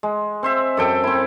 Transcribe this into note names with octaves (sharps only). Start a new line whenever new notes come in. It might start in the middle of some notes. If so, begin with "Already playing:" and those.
G#3
C4 C5 E5
F#2 A4 G5
C4 E4